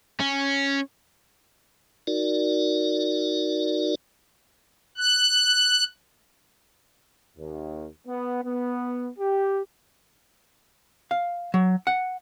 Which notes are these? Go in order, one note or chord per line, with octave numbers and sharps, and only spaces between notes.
C#4
D#4 F#4 A#4 D5
F#6
D#2
B3
B3
G4
F5
F#3
F#5